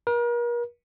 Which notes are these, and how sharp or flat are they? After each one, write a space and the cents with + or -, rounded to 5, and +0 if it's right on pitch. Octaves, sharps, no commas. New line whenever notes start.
A#4 +40